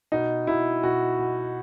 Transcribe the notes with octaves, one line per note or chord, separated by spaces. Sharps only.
B2 D#4
B2 E4
B2 F#4
B2